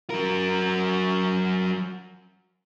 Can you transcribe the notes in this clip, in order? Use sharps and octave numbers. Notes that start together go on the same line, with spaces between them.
F#3 A#4